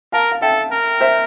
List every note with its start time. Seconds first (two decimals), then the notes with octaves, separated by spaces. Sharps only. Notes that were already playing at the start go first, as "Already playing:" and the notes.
0.12 A#4 F5 A5
0.31 F5
0.42 A4 E5 G5
0.72 A#4
1.00 C5 E5